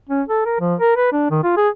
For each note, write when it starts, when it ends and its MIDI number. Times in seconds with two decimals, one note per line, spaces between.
0.09 0.22 61
0.28 0.41 69
0.45 0.57 70
0.60 0.75 53
0.80 0.92 70
0.96 1.10 71
1.12 1.29 62
1.30 1.39 51
1.43 1.55 65
1.57 1.69 68